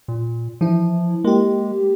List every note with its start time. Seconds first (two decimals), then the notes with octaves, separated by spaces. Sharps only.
0.08 A#2
0.61 E3 F3 E4
1.24 G#3 A#3 G4